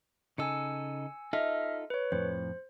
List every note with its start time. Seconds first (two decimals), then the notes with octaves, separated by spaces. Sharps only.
0.38 C#3 D#4 A4 G#5 E6 C#7
1.33 D#4 F4 A4 D#5 E5 F6
1.90 B4 C#5
2.12 F2 A2 C5